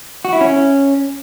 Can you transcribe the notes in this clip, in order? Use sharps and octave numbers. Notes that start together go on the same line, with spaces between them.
F#4
E4
C#4